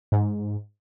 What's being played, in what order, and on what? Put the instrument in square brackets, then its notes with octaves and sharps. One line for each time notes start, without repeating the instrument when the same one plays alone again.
[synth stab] G#2